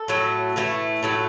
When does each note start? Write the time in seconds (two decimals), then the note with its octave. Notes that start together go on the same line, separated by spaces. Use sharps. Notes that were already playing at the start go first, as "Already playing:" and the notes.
Already playing: A4
0.08 A2 F#3 A3
0.56 A2 E3 A3
1.03 A2 F#3 A3